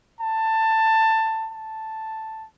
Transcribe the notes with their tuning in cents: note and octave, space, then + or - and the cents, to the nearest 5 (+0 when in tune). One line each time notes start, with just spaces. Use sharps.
A5 +15
A5 +0